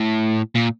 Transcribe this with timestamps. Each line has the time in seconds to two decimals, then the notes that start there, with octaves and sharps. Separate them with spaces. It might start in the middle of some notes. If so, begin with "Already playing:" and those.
Already playing: A2
0.55 A#2